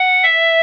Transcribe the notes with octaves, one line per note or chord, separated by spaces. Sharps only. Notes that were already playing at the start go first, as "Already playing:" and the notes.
Already playing: F#5
E5